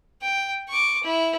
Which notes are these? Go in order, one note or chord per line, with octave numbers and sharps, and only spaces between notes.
G5
C#6 D6
E4